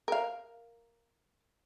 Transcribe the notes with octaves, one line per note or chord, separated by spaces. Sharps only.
A#4 F5